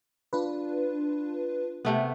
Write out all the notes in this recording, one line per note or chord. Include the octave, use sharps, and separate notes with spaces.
D4 F4 B4
C3 A3 B3